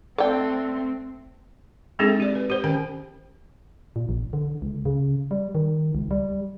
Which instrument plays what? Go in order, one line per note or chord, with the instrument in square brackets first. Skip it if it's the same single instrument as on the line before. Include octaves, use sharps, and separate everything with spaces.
[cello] A3 C4 [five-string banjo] D4 G5 [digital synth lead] A4
[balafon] G#3 C4 D4 D#4 G#4 A4
G4 D5
B4
G4 C5
D#3 C#4 G5 B5
[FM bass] A#2
A#1
D3
C#2
C#3
G3
D#3
C#2
G3